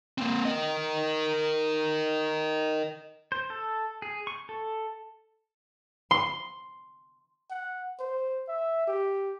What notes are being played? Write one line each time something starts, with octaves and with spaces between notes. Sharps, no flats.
A#3 C4
A#4 D#5
C5
A4
G#4
C#6
A4
C6
F#5
C5
E5
G4